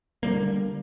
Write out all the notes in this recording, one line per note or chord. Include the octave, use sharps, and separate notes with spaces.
D3 G3 A#3